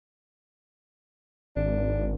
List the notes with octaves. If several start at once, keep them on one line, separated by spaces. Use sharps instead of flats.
G#1 D4